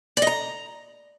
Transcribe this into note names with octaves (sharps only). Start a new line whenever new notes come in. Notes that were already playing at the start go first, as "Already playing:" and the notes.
D5
D#5
A#5